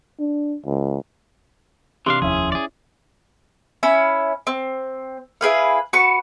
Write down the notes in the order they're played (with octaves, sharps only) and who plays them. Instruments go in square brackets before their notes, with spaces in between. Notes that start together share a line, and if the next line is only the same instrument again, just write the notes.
[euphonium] D4
C#2
[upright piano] C3 [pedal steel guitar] E3 D4 F5 [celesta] C6
[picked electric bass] F1 D#2 F3 [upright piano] C#4 E4 [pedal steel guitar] G#4
[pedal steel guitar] G#4 D5
[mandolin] C#4 E4 E5 B5
C4
E4 G#4 B4 F5
F#4 B4 C#6